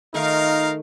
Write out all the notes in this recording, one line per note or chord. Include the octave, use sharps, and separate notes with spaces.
D#3 A3 D#4 F4 A#4 F5 C#6